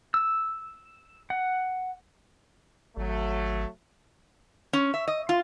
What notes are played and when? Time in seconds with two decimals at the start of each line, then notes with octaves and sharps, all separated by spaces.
0.14 E6
1.30 F#5
2.97 G#1 F#3 A3
4.73 C#4
4.94 E5
5.08 D#5
5.29 F4